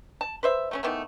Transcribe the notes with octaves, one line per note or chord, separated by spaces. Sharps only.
A5
B4 C5 E5
A3 B3 C#4
D#3 E3 A3 B3